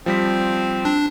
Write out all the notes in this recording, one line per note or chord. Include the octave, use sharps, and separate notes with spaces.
F3 G3 C4 B6
D4